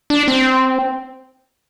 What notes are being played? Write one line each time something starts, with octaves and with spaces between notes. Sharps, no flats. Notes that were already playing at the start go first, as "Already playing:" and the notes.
D4
C4